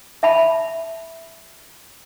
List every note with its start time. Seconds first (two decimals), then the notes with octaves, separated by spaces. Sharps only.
0.23 E5 A5 B5